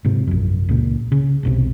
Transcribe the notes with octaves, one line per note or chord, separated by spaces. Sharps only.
G#2 C3
A#1 F#2
C#2 A#2
C#3
E1 B1 C3